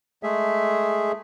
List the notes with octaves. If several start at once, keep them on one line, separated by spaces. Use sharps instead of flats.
G#3 A3 G#4 E5